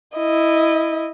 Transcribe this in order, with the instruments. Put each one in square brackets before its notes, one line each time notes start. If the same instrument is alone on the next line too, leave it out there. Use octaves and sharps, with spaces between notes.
[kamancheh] E4 D#5